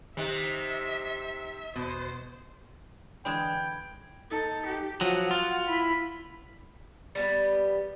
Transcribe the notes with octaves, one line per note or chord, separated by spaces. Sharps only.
C3 D#3 D#4 E5
G#1 E2 B2 C5
D3 E3 G#3 G5 B5 G#6
D#4 A4
G4
F3 F#3 F#4 F#5
F4
E4 B5
G3 B3